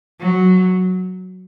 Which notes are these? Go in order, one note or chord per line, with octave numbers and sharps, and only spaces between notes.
F#3